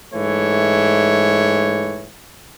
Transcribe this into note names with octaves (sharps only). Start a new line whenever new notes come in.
G#2 E3 A3 C#5